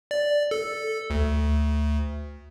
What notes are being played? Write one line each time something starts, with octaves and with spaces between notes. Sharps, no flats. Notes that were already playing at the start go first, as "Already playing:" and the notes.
D5
A4
D2